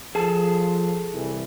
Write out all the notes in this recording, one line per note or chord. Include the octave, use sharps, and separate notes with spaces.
F3 G#4 A4 A5
C2 E3